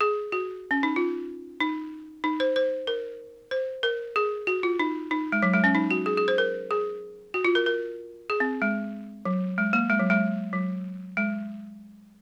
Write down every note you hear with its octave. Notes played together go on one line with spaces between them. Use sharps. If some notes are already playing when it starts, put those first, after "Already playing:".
G#4
F#4
C#4
D#4
F4
D#4
D#4
C5
C5
A#4
C5
A#4
G#4
F#4
F4
D#4
D#4
G#3
F#3
G#3
C#4
D#4
F#4
G#4
G#4
C5
A#4
G#4
F#4
F4
A#4
A#4
G#4
C4
G#3
F#3
G#3
A#3
G#3
F#3
G#3
F#3
G#3